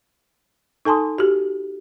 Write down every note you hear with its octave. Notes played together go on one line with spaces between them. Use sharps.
D#4 A4 G#5 A5 C6 D#6
F#4 G4